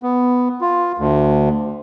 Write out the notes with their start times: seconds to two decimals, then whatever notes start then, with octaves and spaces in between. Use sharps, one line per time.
0.03 B3
0.61 F4
0.98 D2